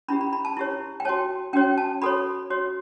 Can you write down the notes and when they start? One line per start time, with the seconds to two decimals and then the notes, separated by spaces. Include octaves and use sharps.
0.08 C#4 E4 G4 B5
0.21 B5
0.33 B5
0.45 A5
0.57 E4 G4 C#5
1.00 G5
1.05 F#4 C#5 A5
1.53 C#4 F#4 C#5 G5
1.78 A5
2.02 F#4 A4 C#5 B5
2.50 F#4 C#5